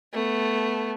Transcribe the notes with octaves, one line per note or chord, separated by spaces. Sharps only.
A3 B3